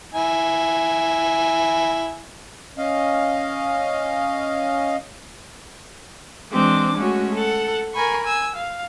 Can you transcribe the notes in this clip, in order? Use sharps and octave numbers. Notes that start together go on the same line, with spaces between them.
E4 G#5
C#4 D#5 F5
E3 G#3 C4 D4 D6
G#3 A3 C#4 F#4
A4 F#5
A#4 G#5 B5 C#6
G#5 E6
F5